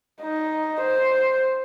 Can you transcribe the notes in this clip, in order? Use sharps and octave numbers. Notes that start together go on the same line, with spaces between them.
D#4
C5